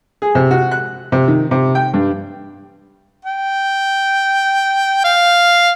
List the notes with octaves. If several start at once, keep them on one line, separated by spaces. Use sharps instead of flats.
G#4
C3
F#4
F#6
C3
D#3
C3
G5
G2
G5
F5